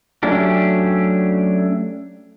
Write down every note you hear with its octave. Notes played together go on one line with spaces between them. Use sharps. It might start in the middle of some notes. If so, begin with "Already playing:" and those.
F#3 A3 C#4 D4 G4